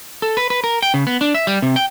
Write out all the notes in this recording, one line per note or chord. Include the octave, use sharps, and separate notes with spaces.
A4
B4
B4
A#4
G5
C#3
B3
D4
E5
G3
C3
G5